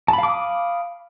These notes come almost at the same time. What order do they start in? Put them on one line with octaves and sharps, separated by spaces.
A5 B5 F5 D6 D#6